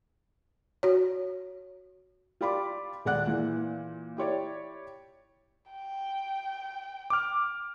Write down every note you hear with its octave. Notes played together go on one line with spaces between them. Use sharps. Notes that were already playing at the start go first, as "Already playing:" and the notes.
F#4 C#5
F4 G4 D5 B5 C6 D6
D#1 G#3 D5 F#5 F#6
A#2 E3
E4 G4 C#5 D5
G5
D6 F6